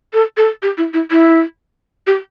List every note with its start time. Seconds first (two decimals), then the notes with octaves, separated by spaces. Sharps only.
0.13 A4
0.37 A4
0.62 G4
0.78 E4
0.94 E4
1.11 E4
2.07 G4